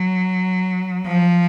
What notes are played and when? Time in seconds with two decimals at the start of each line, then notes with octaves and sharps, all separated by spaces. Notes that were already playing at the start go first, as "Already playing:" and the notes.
Already playing: F#3
1.07 F3